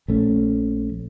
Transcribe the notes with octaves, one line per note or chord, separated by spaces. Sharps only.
A#1 A3 C#4